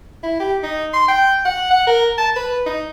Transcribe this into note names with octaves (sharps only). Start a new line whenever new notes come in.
E4
G4
D#4
C6
G5
F#5
F#5
A#4
A5
B4
D#4